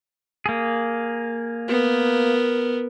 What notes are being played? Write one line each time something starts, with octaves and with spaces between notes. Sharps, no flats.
A#3 G#4
B3 A#4